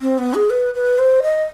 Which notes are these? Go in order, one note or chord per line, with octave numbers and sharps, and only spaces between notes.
C4
B3
G#4
B4
B4
C5
D#5